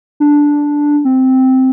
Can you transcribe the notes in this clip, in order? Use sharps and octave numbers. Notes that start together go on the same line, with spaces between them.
D4
C4